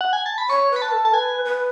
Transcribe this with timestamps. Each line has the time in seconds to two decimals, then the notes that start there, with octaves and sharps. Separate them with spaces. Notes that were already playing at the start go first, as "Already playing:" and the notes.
0.01 F#5
0.13 G#5
0.26 A5
0.38 B5
0.50 C#5 C#6
0.71 B4
0.76 B5
0.82 A5
0.92 A4
1.05 A5
1.13 B4 G#5
1.45 B4